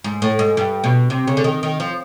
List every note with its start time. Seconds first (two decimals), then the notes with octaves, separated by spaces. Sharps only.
0.04 G#2
0.22 A2
0.39 G#2
0.57 G2
0.84 B2
1.10 C3
1.27 C#3
1.37 D3
1.44 D#3
1.63 D#3
1.80 F3